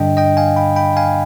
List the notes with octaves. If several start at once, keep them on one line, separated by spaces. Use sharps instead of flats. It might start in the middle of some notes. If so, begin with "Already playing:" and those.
Already playing: G2 D3 G3 D4 D#5 G5
D#5 G5
F5 G#5
G5 B5
G5 B5
F5 G#5